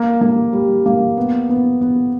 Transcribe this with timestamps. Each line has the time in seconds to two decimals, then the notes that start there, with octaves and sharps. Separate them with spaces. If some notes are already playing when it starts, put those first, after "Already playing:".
Already playing: A#3
0.21 A#3
0.53 G3
0.86 A#3
1.17 B3
1.49 B3
1.81 B3